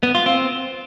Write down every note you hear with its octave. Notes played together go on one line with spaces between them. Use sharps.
B3
F4
C4